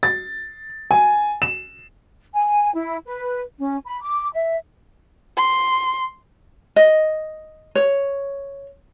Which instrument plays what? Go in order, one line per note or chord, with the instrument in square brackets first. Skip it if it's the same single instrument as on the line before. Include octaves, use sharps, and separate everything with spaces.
[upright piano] A6
G#5
E7
[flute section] G#5
E4
B4
C#4
B5
D6
E5
[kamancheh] C6
[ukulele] D#5
C#5